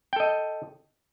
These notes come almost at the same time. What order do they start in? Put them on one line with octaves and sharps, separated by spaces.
G5 A4 D#5